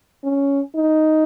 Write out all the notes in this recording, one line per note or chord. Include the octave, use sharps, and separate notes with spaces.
C#4
D#4